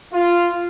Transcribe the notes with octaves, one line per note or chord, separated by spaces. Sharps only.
F4